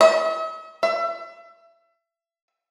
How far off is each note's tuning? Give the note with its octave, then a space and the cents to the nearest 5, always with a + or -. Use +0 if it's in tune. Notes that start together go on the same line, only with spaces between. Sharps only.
E5 -45
E5 +30